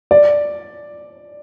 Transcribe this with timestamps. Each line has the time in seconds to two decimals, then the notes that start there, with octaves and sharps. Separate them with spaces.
0.11 D5